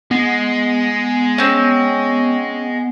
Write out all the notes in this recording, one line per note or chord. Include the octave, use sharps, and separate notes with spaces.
G#3 B3
C4 C#4